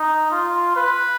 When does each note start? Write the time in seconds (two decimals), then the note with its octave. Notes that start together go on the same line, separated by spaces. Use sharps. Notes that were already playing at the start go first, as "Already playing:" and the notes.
Already playing: D#4
0.31 F4
0.76 B4